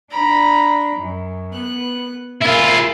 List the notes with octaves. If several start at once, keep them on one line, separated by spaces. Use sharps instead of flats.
D4 A#5 B5
F#2
B3 F#6
E4 F4 G#4 A#4